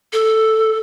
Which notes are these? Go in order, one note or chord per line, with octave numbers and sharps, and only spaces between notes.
A4